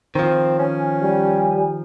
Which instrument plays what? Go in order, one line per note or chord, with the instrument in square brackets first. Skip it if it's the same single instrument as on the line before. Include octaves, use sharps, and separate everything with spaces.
[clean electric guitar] D#3 F3 [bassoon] C4
[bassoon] C#4 [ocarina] G#5
[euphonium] G3 [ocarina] G#5